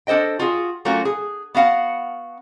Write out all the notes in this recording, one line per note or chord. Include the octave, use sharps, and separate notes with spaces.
D4 A4 C5 D#5 G5
F4 F#4 G#4
F#3 A3 A#3 C#4 F4 F#4
G#4
B3 F#4 F5 F#5